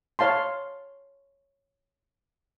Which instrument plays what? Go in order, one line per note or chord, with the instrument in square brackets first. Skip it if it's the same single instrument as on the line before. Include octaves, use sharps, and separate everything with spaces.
[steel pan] C#5 F5 A5 C6